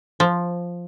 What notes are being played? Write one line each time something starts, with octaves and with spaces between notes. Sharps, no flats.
F3